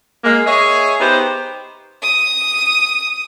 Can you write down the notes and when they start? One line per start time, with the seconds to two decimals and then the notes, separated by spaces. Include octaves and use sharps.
0.24 G#3 A#3
0.45 G#4 C#5 D#5 E5
0.99 B3 D#4 G4 C5
2.03 D#6